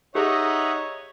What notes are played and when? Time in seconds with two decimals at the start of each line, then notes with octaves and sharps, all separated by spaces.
0.15 D#4 G4 G#4 C#5 D#5 E5 F#5